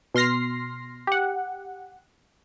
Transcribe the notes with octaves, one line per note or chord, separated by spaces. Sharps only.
B2 C6 F6 A#6 C7
G4 F#5